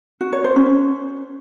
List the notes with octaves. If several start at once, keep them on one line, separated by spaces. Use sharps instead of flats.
F#4
C#5
C5
C#4